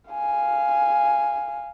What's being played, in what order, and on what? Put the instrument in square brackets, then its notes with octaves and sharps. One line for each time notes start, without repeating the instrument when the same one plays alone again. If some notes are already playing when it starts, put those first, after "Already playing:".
[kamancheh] F5 G#5